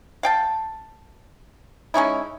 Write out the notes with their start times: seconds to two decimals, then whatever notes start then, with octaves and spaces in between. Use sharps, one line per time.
0.23 F5 G5 A5
1.94 G#3 C#4 D#4 E4